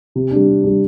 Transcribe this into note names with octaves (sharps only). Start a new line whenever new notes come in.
C3
G3 D4
C3
G3 D4